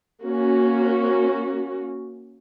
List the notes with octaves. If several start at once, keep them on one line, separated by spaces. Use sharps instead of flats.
A#3 C#4 F#4